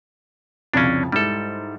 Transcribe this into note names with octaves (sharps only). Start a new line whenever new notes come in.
C2 F2 C#3 C#4 D4
G#2 G3 E4 A4